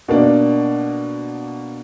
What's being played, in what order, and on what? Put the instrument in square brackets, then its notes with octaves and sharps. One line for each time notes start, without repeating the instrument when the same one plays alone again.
[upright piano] B2 A#3 D4